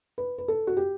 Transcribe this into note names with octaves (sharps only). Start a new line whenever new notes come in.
B4
B4
A4
F#4
G4